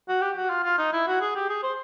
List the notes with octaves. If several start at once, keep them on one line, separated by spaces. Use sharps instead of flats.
F#4
G4
F#4
F4
F4
D#4
E4
F#4
G#4
G4
G#4
C5